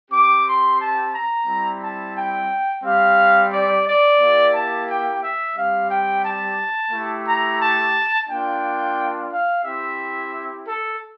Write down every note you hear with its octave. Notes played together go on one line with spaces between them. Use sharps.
C4 G4 D6
C6
A5
A#5
G3 C4 E4
A5
G5
G3 C4 G4 F5
D5
D5
A#3 E4 G4
A5
G5
E5
G3 C4 G4 F5
G5
A5
A3 E4 G4
A#5
A5
A#3 D4 F4 G5
F5
C4 E4 G4 E5
A4